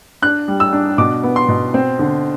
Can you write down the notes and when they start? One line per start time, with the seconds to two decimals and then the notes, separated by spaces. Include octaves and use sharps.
0.22 D4 F#6
0.48 G3
0.60 E6
0.73 D4
0.98 B2 D6
1.23 B3
1.36 C6
1.49 B2
1.74 C4
1.99 D3